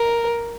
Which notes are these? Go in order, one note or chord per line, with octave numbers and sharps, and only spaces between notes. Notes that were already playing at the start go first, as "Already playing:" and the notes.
Already playing: A#4